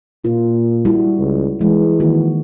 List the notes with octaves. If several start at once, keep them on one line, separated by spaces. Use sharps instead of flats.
A#2 F4
G3 E4 F#4
C#2
E3 G#3
D#3 A#3 F#4